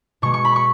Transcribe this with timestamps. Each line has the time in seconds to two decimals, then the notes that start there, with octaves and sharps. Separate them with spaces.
0.22 B2 G#3 C#6
0.34 C#6
0.45 B5
0.56 C#6